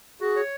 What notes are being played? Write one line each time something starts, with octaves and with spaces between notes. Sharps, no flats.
F#4 G#4
C#5